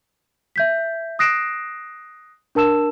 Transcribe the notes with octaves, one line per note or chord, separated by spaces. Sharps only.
E5 G6 B6
D#6 F#6 A#6 C7 D7 E7
D4 A#4 A5 E6 E7